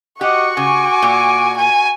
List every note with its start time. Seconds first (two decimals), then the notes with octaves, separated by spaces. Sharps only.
0.21 F#4 G4 D#5 F#5 C#6
0.57 C#3 G#5 D6
1.02 A#2
1.56 G#5